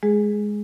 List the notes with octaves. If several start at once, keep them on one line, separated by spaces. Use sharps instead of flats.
G#3 G#4